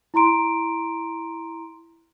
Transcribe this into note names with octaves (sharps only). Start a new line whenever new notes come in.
E4 A#5 C6 D7